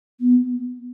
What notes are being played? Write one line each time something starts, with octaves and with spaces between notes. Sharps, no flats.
B3